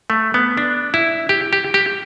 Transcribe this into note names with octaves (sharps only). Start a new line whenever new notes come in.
A3
B3
D4
E4
G4
G4
G4